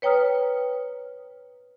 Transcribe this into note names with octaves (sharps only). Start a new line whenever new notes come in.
B4 C#5 G5 A#5 D#6 F6